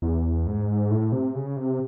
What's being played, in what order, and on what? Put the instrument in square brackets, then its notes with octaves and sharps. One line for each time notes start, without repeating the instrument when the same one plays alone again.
[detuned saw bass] E2
G#2
A2
C3
C#3
C3